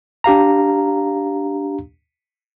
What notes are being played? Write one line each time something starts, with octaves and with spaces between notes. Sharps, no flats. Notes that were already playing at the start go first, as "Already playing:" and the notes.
D4 G4 F5 A#5